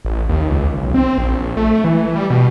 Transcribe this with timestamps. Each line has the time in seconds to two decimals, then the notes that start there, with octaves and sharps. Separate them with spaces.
0.05 A1
0.29 D#2
0.50 C#2
0.78 B1
0.94 C4
1.18 A#1
1.57 A3
1.84 E3
2.15 G3
2.30 B2